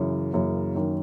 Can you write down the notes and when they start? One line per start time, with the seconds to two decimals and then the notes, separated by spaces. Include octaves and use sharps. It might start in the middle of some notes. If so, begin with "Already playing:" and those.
Already playing: F#2 C#3 E3
0.33 F#2 C#3 E3 A#3
0.75 F#2 D#3